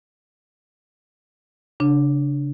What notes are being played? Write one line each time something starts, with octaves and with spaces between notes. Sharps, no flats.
C#3 D4